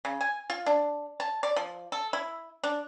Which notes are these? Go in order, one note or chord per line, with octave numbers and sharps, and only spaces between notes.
C#3
G#5
F4
D4
A5
D5
F3
A4
E4
D4